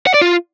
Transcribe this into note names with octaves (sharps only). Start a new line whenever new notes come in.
F#5
D5
F4